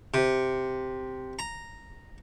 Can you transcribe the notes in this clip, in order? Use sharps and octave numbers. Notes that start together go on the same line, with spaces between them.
C3
A#5